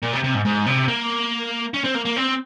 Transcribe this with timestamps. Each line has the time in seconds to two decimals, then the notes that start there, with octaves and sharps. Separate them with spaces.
0.02 A#2
0.13 C3
0.24 C3
0.35 G#2
0.45 G#2
0.66 C3
0.88 A#3
1.74 C#4
1.84 C4
1.95 A#3
2.05 A#3
2.16 C4